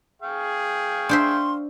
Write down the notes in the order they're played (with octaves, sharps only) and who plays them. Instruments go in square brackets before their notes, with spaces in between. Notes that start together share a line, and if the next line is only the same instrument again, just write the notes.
[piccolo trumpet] G#4 [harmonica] F5 G5 C#6
[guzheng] D4 C5 E5 [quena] C6